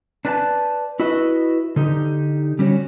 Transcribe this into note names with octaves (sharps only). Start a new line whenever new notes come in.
D4 B4 D5 E5 G5 A5
E4 F#4 B4 D#5 E5
D3 D#4 G4
G3 C#4 F#4 C#5